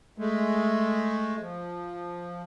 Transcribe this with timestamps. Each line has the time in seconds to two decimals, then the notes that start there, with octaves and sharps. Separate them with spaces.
0.18 G#3 A3
1.40 F3